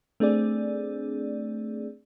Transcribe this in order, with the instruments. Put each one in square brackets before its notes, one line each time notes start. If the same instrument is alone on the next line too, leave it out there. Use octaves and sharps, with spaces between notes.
[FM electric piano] A3 C4 D4 G#4 D5